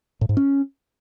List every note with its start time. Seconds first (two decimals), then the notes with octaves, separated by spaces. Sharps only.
0.21 A2
0.29 G#2
0.37 C#4